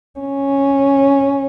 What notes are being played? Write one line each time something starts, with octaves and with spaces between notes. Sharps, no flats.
C#4